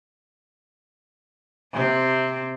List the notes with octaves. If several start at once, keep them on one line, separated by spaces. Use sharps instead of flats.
C3 C4